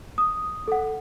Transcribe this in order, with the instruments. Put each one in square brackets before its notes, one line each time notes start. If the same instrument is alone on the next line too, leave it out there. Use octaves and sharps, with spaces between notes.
[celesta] D#6
A4 F#5